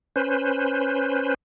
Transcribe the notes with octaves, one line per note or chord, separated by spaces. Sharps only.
C#4 B4 C5